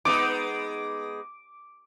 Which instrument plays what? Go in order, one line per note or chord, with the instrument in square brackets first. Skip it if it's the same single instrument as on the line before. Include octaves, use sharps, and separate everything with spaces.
[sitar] G#3 B3 D#4 [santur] D6